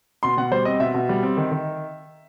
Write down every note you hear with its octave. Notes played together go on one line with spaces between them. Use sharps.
B2 C6
B2 F#5
G3 C5
C4 D#5
B2 E5
B2
G3
C4
D#3
D#3